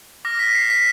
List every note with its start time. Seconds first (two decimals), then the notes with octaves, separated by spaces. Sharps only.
0.25 D6 F6 A#6
0.39 B6
0.55 C7
0.70 B6